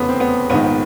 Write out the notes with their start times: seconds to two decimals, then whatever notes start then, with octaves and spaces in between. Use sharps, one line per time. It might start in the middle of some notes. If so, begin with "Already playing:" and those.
Already playing: F1 E2 C#3 B3
0.09 C4
0.20 B3
0.50 A#1 G#2 D#3 B3
0.64 B3